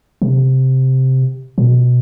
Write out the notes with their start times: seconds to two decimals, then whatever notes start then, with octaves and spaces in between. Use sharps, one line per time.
0.22 C3
1.58 A#2
1.66 B2